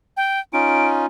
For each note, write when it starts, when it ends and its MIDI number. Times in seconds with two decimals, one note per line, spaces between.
0.17 0.40 79
0.53 1.06 61
0.53 1.06 63
0.53 1.06 65
0.53 0.86 98